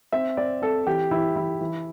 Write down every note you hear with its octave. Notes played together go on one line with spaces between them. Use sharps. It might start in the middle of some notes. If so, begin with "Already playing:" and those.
C4 E5
C4 D5
C4 A4
E3 G4
E3 E4
E3 E4
E3